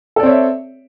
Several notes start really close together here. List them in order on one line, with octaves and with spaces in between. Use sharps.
A4 D5 C4 C#5 E5